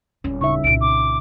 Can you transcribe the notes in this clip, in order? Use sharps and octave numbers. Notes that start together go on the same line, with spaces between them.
D1 G3 C#4
C#3 D#4 E5 C#6
C2 A#2 D7
D6